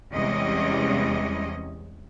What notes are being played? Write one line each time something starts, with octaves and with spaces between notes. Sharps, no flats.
E2 C3 G3 G#3 C#4 D#5